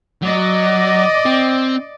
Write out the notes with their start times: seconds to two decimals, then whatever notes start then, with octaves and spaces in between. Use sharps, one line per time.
0.23 F#3 D5 D#5
1.25 C4